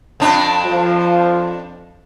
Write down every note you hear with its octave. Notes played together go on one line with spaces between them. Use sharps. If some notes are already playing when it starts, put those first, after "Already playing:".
F2 D4
F3